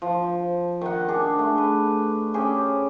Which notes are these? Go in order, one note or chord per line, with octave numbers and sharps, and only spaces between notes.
F3
D#3 F#5
D4 G#4
A3
B4
C#4 G4 G#4